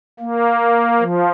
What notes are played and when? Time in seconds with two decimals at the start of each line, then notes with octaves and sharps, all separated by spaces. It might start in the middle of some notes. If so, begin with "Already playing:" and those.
0.20 A#3
0.99 F3